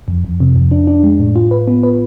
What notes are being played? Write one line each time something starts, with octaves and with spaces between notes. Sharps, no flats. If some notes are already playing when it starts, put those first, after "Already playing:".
F2
F2
C3
F2
D4
D4
G#3
A2
F4
B4
B3
B4